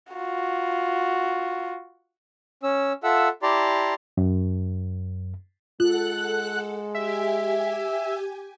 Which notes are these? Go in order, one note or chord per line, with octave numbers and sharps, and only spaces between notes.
F4 F#4
C#4 E6
F4 A4 E5 F#5 E6
E4 G4 D5 A5 A#5 C6
F#2
G#3 F4 A4 F#5 F#6
G4 E5 G#5